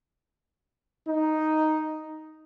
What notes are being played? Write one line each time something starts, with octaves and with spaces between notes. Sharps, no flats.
D#4